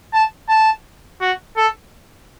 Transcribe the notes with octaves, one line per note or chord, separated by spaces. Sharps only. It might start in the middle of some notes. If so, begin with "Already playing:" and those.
A5
A5
F#4
A4